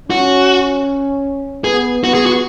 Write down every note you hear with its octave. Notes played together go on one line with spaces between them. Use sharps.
C#4 F#4
B3 G#4
B3 F#4
G#4
F#4